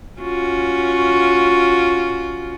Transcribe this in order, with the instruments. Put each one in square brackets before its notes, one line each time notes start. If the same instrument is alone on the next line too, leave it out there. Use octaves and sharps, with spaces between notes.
[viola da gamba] C#4 F4 F#4